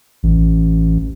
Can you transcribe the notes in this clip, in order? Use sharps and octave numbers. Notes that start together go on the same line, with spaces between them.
A1